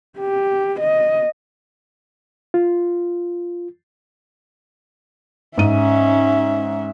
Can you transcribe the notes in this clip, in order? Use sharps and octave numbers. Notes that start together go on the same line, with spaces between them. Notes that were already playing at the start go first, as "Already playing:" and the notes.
G4
D#5
F4
G#2 C#4 E5 D#7